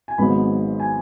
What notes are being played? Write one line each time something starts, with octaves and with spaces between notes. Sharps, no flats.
G#5
G#1 G#2 F#3 B3 B5
G#5